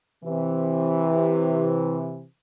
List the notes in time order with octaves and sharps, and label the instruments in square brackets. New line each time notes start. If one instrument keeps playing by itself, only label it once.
[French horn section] C3 E3